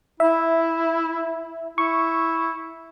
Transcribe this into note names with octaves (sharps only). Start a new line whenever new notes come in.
E4 E5
E4 C#6